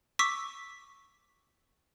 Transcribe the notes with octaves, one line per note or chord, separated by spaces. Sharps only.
C#6 D6 E6 B6